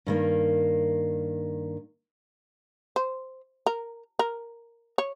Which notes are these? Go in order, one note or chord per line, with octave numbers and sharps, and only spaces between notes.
G2 D#3 A#3
C5
A#4
A#4
C#5